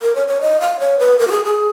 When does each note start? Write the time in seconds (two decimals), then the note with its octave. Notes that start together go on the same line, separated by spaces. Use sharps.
0.02 A#4
0.15 C#5
0.28 C#5
0.41 D#5
0.61 F5
0.80 C#5
0.99 B4
1.19 A#4
1.27 F#4
1.31 G#4
1.45 G#4